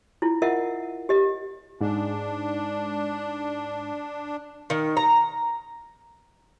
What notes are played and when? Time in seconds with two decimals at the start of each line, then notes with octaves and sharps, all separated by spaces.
0.22 E4 F4
0.42 F4 A#4 D#5 E5 F#5
1.09 G4 D#5
1.81 G#2 D4
4.70 D#3
4.97 A#5